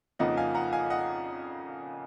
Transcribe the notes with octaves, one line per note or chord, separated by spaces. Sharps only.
F2 C#3 F3 A#3 D#4 D#5 F#5
F5 G#5
F#5 A#5
F5 G#5
D#5 F#5